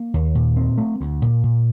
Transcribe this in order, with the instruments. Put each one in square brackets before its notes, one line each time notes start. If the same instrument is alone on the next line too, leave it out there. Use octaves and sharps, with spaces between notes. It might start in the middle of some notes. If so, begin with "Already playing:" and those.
Already playing: [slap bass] A#3
D#2
A#2
C4
A3
D2
A#2
A#2